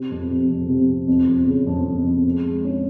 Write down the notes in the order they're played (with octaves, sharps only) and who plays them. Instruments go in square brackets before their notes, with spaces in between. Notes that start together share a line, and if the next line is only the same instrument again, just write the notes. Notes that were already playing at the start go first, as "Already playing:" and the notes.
Already playing: [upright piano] C3
F2
C3
F2
C3
C3
F2
F2
C#3
F2
F2
F2
G#3
G#3
C#4